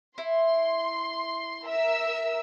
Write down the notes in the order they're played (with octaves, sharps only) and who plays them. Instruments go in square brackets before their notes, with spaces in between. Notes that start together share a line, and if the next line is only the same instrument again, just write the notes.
[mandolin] E4 [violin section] C6
[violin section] A#4 E5 E6